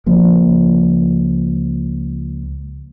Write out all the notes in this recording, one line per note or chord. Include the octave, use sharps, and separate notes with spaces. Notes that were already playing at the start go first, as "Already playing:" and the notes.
C#2 F3 A#3